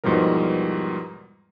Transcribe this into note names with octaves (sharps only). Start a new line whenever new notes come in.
E2 G#2 B2 F3 G3 A#4